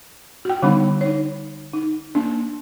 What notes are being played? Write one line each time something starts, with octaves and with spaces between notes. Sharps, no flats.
F#4 G5
D3 G3 B3 D4 D#4 B5
D#4 C#5
D#4
A#3 D4